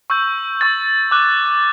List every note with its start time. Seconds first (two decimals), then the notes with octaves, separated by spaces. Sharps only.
0.10 C#6 E6 G6
0.61 C#6 E6 G6 A6
1.11 D6 F#6